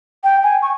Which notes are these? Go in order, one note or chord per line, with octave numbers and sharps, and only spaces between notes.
G5
G#5
C#6